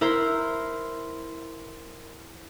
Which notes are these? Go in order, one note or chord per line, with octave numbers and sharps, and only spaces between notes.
E4 A#4 C5